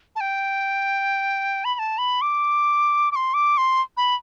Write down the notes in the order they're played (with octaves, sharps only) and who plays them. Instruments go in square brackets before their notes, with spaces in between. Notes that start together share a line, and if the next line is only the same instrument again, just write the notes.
[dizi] A5
G5
B5
B5
A5
B5
D6
D6
C6
D6
C6
B5